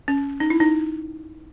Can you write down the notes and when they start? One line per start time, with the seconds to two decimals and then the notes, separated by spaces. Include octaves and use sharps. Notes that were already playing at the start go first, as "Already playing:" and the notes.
0.08 C#4
0.40 D#4
0.50 E4
0.60 D#4